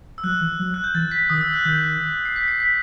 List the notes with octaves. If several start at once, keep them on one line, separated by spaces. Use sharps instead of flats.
E6
F#3 F#6
E3
F#3
F#6
G6
E3 A6
B6
D#3 D#6
E6
F#6
D#3 G6
C7
B6
C7
B6